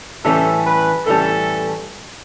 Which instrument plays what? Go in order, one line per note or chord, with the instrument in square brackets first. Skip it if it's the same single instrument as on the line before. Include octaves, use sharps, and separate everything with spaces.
[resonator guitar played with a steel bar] A2 E3 G3 C#4 [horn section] A4
[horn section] B4
[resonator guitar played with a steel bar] A2 E3 G3 C#4 [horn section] A4